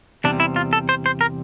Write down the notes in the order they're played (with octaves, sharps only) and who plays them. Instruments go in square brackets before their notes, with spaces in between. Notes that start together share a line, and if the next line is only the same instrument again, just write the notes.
[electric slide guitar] E2 C3 G3 C4 D4
E4
F4
A4
C5
C5
A#4